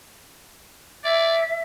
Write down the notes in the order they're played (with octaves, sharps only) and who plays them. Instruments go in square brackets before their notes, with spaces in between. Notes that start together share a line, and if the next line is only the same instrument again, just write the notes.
[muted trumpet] D5 [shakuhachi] E5